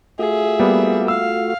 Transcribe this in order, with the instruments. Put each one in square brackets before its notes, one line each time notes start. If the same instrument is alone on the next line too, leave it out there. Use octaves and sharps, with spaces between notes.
[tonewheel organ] A3 F4 F#4 [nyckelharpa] G#4 [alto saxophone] E5
[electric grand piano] G3 A#3 B3
[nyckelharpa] F5 [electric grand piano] E6